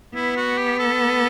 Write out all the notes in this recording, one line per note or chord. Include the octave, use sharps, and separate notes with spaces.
B3 E4
F#4
G4
A4